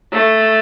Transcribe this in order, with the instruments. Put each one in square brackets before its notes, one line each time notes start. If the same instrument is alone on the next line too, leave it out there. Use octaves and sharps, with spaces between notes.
[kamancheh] A3